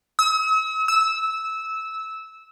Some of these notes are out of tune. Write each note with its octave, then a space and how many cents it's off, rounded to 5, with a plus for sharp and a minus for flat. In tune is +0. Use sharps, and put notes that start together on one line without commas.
E6 -45
E6 -15